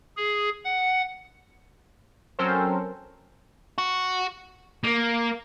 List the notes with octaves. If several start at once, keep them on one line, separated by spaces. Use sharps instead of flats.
G#4
F#5
F#3 C4 C#4 A4 A#4 C5
F#4
A#3